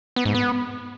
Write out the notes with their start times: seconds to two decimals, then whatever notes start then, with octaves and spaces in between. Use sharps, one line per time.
0.16 B3
0.25 G#2
0.34 B3